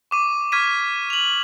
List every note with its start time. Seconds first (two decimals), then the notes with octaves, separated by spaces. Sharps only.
0.11 C#6 D6 D#7
0.52 C#6 D6 F6 G#6 B6 D#7
1.10 F7 F#7